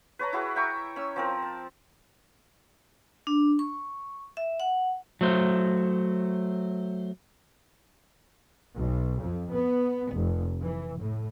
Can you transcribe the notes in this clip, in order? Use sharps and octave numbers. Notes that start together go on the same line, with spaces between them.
B4 C#5 A5 A#5
E4 F#4 G#4
E5 G5 A#5 C#6
C#4 E6
F3 C4 A#4
A5
D4
C#6
E5
F#5
F#3 A3 C5
B1
F2
B3
F1
E3
A2